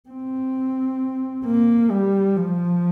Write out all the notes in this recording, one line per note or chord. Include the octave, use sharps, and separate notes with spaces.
C4
A#3
G3
F3